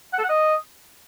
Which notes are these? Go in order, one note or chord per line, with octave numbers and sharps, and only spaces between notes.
F#5
A4
F#5
D#5